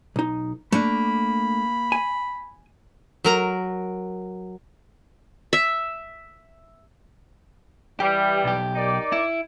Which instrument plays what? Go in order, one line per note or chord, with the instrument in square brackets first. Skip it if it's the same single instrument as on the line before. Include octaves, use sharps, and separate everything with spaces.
[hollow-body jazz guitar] B1 D#4
[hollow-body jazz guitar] A3 D4 [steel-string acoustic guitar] A#3 [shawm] B5
[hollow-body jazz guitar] G#5
[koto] F#3 A#4 A#5
[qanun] E5
[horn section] E3 G3 [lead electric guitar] G4
[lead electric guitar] B1 G4
[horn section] D#4 A#4 D5
[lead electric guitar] E4